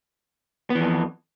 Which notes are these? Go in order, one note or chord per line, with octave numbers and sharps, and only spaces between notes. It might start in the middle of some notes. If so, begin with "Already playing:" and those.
F2 E3 B3